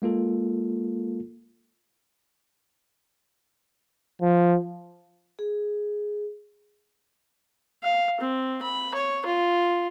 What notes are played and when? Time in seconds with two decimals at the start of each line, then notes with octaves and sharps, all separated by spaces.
0.02 G#3 A#3 F4 A4
4.22 F3
5.39 G#4
7.83 F5
8.21 C4
8.62 B5
8.95 C#5
9.26 F4